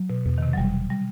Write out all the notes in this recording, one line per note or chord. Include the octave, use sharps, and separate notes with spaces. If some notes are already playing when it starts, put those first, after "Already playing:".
Already playing: F#3
B2
E2 B2
D#3
C3
F#3
E1 G3
G3